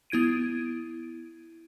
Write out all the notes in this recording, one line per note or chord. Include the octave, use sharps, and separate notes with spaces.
B3 E4 G#6 D7 D#7